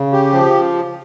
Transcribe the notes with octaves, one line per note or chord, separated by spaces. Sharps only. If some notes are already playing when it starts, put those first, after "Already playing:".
Already playing: C#3
G4
F3